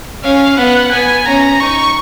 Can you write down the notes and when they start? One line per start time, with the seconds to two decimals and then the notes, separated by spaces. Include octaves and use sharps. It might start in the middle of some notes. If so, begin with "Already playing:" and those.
0.23 C#4 F5
0.57 B3 F#5
0.92 B3 G#5
1.26 C#4 A#5
1.60 D#4 C#6